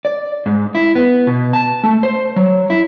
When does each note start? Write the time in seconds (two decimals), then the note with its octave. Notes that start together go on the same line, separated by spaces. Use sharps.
0.05 D5
0.46 G#2
0.75 E4
0.95 B3
1.27 B2
1.53 A5
1.84 A3
2.03 C5
2.36 F#3
2.70 E4